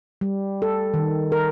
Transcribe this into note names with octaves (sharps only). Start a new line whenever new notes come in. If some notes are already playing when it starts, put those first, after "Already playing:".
G3
A4
D#3
A#4